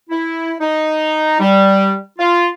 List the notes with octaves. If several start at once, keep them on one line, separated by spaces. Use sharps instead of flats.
E4
D#4
G3
F4